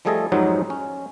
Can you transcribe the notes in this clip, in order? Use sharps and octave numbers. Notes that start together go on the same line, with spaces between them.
F3 G3 A3 G#4 A4 D#5
F2 G#2 F#3 G3 C4 D#4
C#4